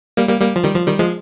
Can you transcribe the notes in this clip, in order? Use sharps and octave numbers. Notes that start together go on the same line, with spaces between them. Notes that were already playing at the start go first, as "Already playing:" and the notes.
G3 A#3
G3 A#3
G3 A#3
F3
D#3 G3
F3
D#3 G3
F3 G#3